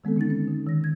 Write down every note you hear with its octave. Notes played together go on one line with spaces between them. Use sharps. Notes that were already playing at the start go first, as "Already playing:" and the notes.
D#3 G#3 B3 C4 A4
D3 C#4 D#4 A6
C#4
D3
D#3 A#6
D3 G#6